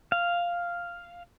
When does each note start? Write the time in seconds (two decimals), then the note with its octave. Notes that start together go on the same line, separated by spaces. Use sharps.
0.12 F5